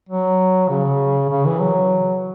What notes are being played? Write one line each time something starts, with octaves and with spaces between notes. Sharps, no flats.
F#3
C#3
C#3
E3
F#3